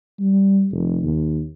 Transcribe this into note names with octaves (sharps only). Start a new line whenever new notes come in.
G3
F1
D#2